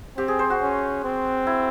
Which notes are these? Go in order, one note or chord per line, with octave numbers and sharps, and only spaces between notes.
C4 G4
G#4
C5
F#4
C#4
C4
E4